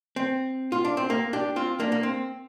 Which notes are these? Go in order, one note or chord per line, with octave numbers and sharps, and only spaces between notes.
C4
F4
D4
C4
A#3
D4 G4
C4 F4
A#3 D4
A#3
C4